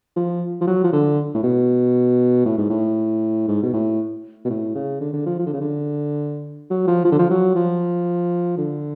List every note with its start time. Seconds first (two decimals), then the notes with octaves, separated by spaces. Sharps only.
0.16 F3
0.61 F3
0.67 F#3
0.84 F3
0.93 D3
1.35 A2
1.43 B2
2.45 A2
2.58 G#2
2.70 A2
3.48 G#2
3.63 B2
3.73 A2
4.45 B2
4.50 A2
4.75 C#3
5.01 D3
5.13 D3
5.26 F3
5.39 F3
5.46 D3
5.53 C#3
5.61 D3
6.70 F#3
6.87 F3
7.05 F3
7.12 D3
7.19 F3
7.30 F#3
7.56 F3
8.58 D3